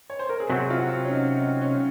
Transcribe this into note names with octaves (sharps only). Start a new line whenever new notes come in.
C#5
C5
A#4
G#4
C3 F#3 C4 F#4
F4
F#4
C#4
D#4
D#4
C#4